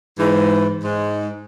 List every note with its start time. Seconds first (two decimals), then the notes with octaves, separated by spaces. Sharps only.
0.18 G#2 E3
0.84 G#2 G#3